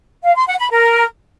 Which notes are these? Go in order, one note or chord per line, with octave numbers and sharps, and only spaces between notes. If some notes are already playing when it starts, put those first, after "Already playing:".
F5
C6
F#5
B5
A#4